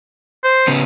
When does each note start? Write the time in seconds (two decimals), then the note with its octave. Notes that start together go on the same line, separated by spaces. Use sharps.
0.44 C5
0.68 C#3 B3